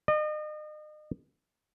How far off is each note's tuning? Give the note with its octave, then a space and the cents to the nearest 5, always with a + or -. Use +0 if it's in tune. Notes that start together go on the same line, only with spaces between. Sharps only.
D#5 -35